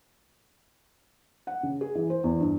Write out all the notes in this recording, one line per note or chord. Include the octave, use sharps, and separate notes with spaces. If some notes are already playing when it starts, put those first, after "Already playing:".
F#5
C#3
G#4
E3
C5
E2
G2